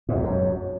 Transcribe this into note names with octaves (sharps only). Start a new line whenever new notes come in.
G#2
E2
F#2